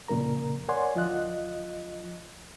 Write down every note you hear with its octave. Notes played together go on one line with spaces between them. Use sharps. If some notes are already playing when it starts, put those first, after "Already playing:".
F2 A#2 C#3 A#4 A#5
A#4 C#5 D5 F#5 G#5 C6
D2 F3 F4 D#5 F5 F#6